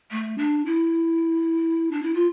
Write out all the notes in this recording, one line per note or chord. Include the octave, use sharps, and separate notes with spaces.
A3
D4
E4
D4
E4
F4